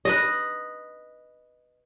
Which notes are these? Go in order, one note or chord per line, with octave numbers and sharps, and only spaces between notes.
B4 D#5